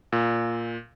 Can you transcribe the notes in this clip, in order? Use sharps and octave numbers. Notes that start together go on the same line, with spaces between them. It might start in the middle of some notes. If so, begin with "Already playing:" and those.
A#2